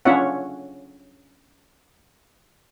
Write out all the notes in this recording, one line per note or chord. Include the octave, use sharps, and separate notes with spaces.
C#4 D4 F4 C#5 E5 F#5